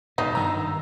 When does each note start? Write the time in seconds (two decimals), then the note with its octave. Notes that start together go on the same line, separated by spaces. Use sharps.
0.18 G#2 B2 D#4
0.35 G2 D#3 A#5 E6